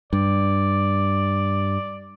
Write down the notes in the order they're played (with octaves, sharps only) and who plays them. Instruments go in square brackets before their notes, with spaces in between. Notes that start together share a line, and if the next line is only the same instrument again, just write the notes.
[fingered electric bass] G2 [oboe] D5